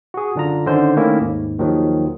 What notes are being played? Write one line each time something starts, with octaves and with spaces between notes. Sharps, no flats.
F#4 G#4
F#2 D3 D4 F4 A#5
D3 D#3 C#4 D#4 C5
D#3 A3 A#3 C#4 E4
D#2 G#2
D#2 D#3 F3 F#3